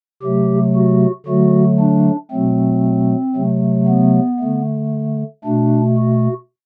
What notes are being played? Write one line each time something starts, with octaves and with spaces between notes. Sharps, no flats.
C3 F#3 A3 G4
F#4
D3 F#3 A3 F#4
D4
B2 F#3 A3 C4
C3 F#3 A3
B3
D3 A3
B2 A3 D4
F#4